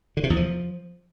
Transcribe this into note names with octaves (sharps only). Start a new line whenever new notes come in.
D3
C3
E2
F3